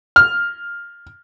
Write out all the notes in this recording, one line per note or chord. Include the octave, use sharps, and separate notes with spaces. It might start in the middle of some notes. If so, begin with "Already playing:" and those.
F6